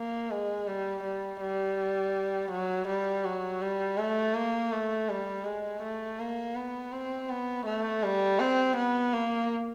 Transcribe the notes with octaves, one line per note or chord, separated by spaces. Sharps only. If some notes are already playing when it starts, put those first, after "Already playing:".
Already playing: A#3
G#3
G3
G3
G3
F#3
G3
F#3
G3
A3
A#3
A3
G3
G#3
A3
A#3
B3
C4
B3
A3
G3
C4
B3
A#3